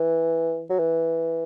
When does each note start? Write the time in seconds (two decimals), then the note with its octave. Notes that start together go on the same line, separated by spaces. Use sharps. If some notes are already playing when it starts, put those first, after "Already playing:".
Already playing: E3
0.70 F#3
0.79 E3